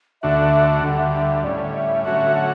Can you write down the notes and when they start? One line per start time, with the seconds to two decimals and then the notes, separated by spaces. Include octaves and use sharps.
0.22 D2 D3 A3 D4 F#4 E5
0.83 D2 D3 G3 F#5
1.14 E5
1.44 A2 G3 C#4 D5
1.74 E5
2.04 D3 F#3 A3 C#4 F#4 E5
2.36 F#5